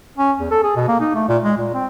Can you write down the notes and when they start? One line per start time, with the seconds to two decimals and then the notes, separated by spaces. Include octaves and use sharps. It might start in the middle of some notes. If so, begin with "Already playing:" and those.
0.18 C#4
0.40 E2
0.51 A4
0.63 G#4
0.76 B2
0.88 A#3
1.00 D#4
1.15 A3
1.29 A#2
1.43 G#3
1.58 A#2
1.74 C4